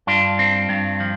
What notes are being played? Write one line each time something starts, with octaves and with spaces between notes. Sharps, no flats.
G2 D4 F4
C4
G2
F3